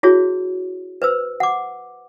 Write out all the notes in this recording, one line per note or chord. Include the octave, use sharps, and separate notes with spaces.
E4 F#4 G#4 C#5
B4 C5 E6
F#5 D6